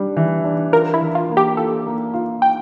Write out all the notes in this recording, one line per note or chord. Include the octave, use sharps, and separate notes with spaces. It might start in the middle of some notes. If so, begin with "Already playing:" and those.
Already playing: G3 D4
E3
D4
F4 A#4
E4
E3
F4
A#3
G4
F4 A4
A#3
F4
G5